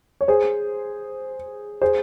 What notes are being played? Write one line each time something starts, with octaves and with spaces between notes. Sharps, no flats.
C#5
G#4 C5
G#4 C5